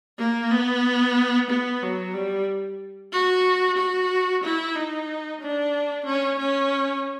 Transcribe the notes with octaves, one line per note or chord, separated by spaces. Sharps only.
A#3
B3
B3
F#3
G3
F#4
F#4
E4
D#4
D4
C#4
C#4